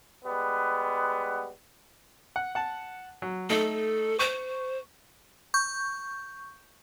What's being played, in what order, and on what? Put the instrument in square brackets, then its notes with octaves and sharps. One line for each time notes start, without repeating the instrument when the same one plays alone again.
[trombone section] G3 G#3 B3
[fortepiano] F#5
F#5 A5
F#3
[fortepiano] A3 D#4 [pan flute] A4
[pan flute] C5 [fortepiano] C#6
[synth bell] C#6 G6